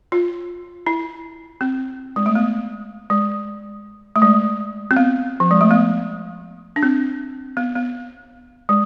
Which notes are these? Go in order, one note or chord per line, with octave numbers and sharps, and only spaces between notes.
F4
E4
C4
G#3
A3
B3
G#3
A3
G#3
C4
B3
F3
G#3
A3
B3
D4
C4
B3
B3
G#3